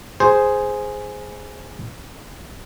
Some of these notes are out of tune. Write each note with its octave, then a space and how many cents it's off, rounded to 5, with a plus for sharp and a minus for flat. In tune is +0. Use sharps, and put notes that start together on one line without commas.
G#4 +0 C5 -5